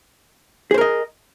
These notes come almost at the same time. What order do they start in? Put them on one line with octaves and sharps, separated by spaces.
G#4 C5 A#4 D#5